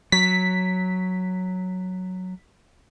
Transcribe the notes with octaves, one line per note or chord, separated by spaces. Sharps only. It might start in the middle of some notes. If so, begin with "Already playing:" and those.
F#3 B6